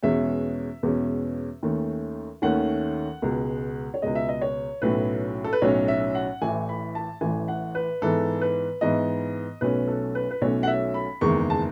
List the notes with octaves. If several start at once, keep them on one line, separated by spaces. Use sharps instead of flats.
E2 B2 G#3 C#4 E5
E2 B2 G#3 C#4
D#2 D#3 A3 C#4
D#2 D#3 A3 C#4 F#5
C#2 B2 G#3
C#5
C#2 B2 G#3 D#5
E5
D#5
C#5
B1 A2 F#3 C#4 B4
A4
B4
B1 A2 F#3 C#4 C#5
E5
F#5
A1 A2 E3 G#5
B5
A5
A1 A2 E3 G#5
F#5
B4
G#2 E3 B3 A4
B4
G#2 E3 B3 D#5
B1 B2 F#3 A3 C#4 B4
A4
B4
B4
B1 B2 F#3 A3 C#4 C#5
F#5
E5
B5
F#1 E2 D#3 G#3 C#6
A5